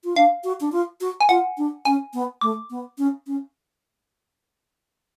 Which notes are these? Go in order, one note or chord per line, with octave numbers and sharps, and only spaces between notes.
F4
D4 F5
F#4
D4
F4
F#4
G#5
F4 F#5
D4
C#4 G#5
B3
A3 D6
B3
C#4
C#4